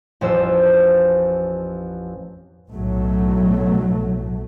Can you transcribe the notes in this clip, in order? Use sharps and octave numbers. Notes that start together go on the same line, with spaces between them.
A1 F2 C5 E6
B1 A2 F#3 A3